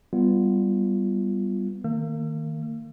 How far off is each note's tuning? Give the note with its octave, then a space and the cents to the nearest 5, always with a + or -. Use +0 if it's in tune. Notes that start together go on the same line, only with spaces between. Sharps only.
G3 +0 B3 +0 F4 -15
D#3 +0 A#3 -30 E6 +35